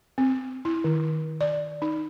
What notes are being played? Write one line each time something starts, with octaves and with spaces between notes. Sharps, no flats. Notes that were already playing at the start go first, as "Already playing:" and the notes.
C4
E4
D#3
D5
D#4